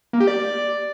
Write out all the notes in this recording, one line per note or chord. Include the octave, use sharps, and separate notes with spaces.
A#3
G4
D5